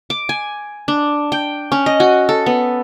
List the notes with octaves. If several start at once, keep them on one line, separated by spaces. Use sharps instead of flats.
D6
G#5
D4
G5
C#4
D#5
F#4
A4
B3